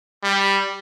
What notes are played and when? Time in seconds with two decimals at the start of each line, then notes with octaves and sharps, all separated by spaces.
0.23 G3